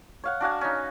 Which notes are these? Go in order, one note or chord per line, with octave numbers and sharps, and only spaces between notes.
C#5 F5 F#5
D4 F#4 F5 G#5
C#4 D#4